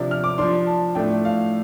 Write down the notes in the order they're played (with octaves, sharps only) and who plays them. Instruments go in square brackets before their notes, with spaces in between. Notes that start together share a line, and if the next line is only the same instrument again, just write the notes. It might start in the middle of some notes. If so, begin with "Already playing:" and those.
Already playing: [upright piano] C3 F3 D4
F6
D6
F3 D4 C6
A5
A2 F3 A3 D4 G5
F5